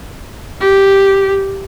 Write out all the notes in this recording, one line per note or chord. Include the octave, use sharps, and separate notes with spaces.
G4